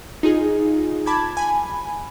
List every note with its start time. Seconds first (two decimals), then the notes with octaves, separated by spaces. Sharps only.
0.23 D#4 F4 G#4
1.06 A5 B5 D6 G#6
1.37 G#5 B5